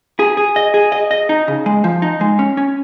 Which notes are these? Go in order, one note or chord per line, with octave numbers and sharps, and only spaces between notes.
G#4
G#4
D#5
G#4
D#5
D#5
D#4
C#3
G#3
F3
D#4
G#3
C#4
C#4